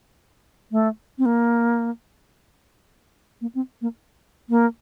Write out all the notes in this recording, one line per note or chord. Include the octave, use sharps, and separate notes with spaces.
A3
C4
A#3
A#3
C4
A#3
A#3